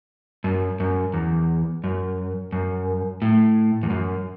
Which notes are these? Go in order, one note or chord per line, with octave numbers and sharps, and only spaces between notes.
F#2
F#2
E2
F#2
F#2
A2
E2
F#2